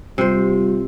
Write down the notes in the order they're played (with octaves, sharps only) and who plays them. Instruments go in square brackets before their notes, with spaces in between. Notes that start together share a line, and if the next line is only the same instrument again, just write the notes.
[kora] C3 C5 [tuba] G3 [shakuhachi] F4